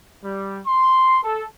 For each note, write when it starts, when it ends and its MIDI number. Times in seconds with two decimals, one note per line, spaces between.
0.24 0.60 55
0.66 1.18 84
1.24 1.44 69